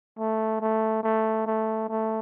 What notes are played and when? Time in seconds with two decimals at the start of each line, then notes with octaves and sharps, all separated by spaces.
0.18 A3
0.60 A3
1.03 A3
1.46 A3
1.89 A3